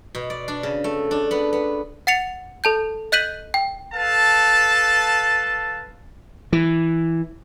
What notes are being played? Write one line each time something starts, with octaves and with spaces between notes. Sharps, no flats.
B2
D5
D4
C#3
A3
D4
B3
B3
F#5 A6 C#7 F7
A4 A5 G6
D#5 F#6 G6 B6 D#7 F#7
G5
A4 B4 F5 A5
E3